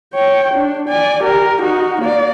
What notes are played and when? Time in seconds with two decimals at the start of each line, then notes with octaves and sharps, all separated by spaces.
0.14 C#5 G5
0.54 D4
0.88 D5 G#5
1.23 G4 A#4
1.62 D#4 F#4
2.02 A#3 D5